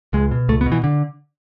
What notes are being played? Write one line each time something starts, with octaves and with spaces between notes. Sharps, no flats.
C#2 G#3
B2
C#2 A3
B3
B2
E3
D3